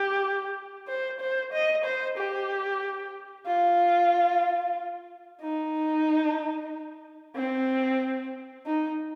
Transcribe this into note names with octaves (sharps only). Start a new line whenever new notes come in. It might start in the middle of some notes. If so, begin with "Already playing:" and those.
Already playing: G4
C5
C5
D#5
C5
G4
F4
D#4
C4
D#4